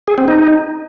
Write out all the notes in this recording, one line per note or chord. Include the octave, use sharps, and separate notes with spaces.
G#4
C4
D#4